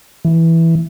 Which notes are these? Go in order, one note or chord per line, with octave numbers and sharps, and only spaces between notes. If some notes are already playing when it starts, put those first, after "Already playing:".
E3